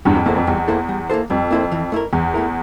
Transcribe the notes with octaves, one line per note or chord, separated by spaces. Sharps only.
E2 G2 G3
F2
E2 A#3 E4 A4 C5
F2
E2 G3
A#3 E4 A4 C5
G3
A#3 E4 A4 C5
F2 G3
A#3 E4 A4 C5
E3
A3 E4 A#4
E2 E3
A3 E4 A#4